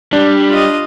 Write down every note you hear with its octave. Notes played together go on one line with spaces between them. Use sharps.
G3 D4
F4 D#5